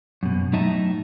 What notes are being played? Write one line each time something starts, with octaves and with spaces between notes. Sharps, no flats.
F#2 B2
A2 F#3 D#4 D#5 E5 A5